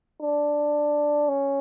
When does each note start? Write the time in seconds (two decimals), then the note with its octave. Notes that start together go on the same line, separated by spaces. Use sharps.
0.20 D4
1.29 C#4